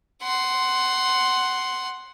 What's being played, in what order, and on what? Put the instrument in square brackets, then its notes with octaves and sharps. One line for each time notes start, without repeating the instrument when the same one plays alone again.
[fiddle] F#5 C6